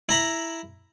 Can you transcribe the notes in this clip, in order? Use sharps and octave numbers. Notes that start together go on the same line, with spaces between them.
E4 A#5 B5